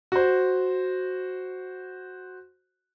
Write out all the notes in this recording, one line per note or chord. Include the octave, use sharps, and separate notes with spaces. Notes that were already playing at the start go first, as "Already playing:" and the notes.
F#4 C5